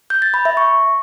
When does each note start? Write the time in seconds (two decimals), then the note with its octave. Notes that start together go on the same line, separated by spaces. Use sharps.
0.10 G6
0.22 A6
0.34 B5
0.45 E5
0.57 C#6